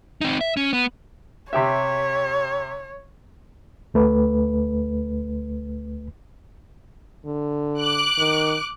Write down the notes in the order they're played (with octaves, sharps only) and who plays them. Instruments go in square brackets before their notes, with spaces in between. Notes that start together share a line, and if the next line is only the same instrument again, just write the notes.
[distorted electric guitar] C4 D#4
E5
C#4
B3
[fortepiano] C3 G4 E5 [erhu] C#5
[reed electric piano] D2 A3 B4
[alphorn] D3
[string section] D6 F#6
[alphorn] D#3